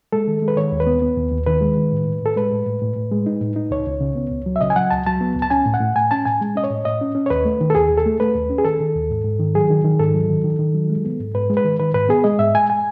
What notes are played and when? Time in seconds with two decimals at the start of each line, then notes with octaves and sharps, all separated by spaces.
0.13 G#3 A4
0.28 D#3
0.42 G#3
0.48 B4
0.56 D#3 C#5
0.72 D#2
0.80 B4
0.87 B3
1.02 B3
1.17 D#2
1.32 D#2
1.47 D#3 B4
1.61 G#3
1.77 D#3
1.92 A2
2.07 A2
2.22 A2 A4
2.37 G#3 B4
2.52 A2
2.66 A2
2.82 A2
2.96 A2
3.12 G#3
3.26 D#4
3.41 A2
3.56 D#4
3.71 C#2 C#5
3.87 C#2
4.01 C#3
4.16 B3
4.31 C#2
4.46 F#3
4.56 E5
4.61 C#3 D#5
4.70 G#5
4.76 F#3 F#5
4.91 C#2 A5
5.07 F#3 A5
5.21 B3
5.36 C#2
5.42 A5
5.50 C#4 G#5
5.66 A2
5.74 F#5
5.81 A2
5.96 A2 G#5
6.11 C#4 A5
6.26 A2 G#5
6.41 G#3
6.56 C#4 D#5
6.64 C#5
6.70 A2
6.85 A2 D#5
7.01 C#4
7.15 C#4
7.26 C#5
7.30 D#2 B4
7.45 A3
7.61 D#3
7.70 A4
7.75 D#2 G#4
7.90 D#2
7.98 A4
8.06 A3
8.20 A3 B4
8.35 D#2
8.50 C#4
8.58 G#4
8.65 D#3 A4
8.81 D#3
8.96 D#2
9.11 G#2
9.25 G#2
9.39 D#3
9.55 F#3 G#4
9.70 D#3
9.84 D#3
9.99 G#2 A4
10.14 F#3
10.30 D#3
10.44 D#3
10.59 D#3
10.75 F#3
10.90 G#3
11.05 B3
11.20 G#2
11.35 G#2 B4
11.50 G#3
11.57 B4
11.64 D#3
11.79 D#3 B4
11.94 G#2 B4
12.09 B3 G#4
12.24 G#3 D#5
12.39 G#2 E5
12.55 G#3 G#5
12.70 G#5